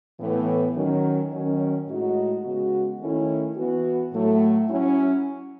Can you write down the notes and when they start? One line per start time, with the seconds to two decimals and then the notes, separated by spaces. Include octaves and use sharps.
0.20 A2 E3 B3
0.76 D#3 F#3 C#4
1.32 D#3 F#3 C#4
1.87 A2 G#3 D#4 F#4
2.44 C#3 G#3 B3 F#4
3.00 D#3 A3 C#4 E4
3.56 E3 B3 F#4
4.12 A2 F#3 A3
4.68 F#3 C#4 E4